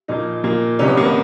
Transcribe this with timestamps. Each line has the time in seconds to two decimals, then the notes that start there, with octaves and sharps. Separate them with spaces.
0.08 A#2 F3 A#3 D#4
0.43 A#2 F3 A#3
0.79 C2 C3 D#3 G3 C#4
0.88 B3
0.97 A#3
1.05 B3